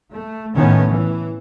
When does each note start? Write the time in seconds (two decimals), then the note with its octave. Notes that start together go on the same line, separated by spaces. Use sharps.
0.15 A3
0.55 A2 D#3 B3 C#4
0.89 E3